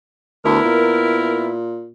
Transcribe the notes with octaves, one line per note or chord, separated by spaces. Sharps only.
D2 B3 E4 A#4
A#2